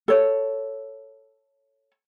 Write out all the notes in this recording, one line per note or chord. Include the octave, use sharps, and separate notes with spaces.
A4 C#5